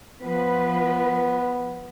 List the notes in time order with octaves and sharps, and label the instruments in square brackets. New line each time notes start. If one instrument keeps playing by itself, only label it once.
[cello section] F3 B4 [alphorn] B3